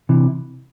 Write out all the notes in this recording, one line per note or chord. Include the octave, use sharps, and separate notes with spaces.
C3 E3